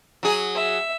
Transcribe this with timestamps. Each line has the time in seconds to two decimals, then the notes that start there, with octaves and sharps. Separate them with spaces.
0.23 F#3 G#4
0.54 E5